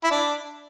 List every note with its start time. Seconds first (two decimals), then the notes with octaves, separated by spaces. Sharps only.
0.04 E4
0.11 D4